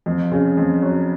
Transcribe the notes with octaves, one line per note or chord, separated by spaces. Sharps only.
F2
C#3
F2
F#3